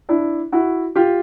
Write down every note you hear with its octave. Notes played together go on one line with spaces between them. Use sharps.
D4 E4
E4 F#4
F4 G4